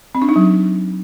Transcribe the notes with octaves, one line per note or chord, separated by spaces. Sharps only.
C4
D4
D#4
F#3